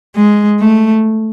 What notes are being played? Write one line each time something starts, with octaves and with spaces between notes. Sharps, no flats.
G#3
A3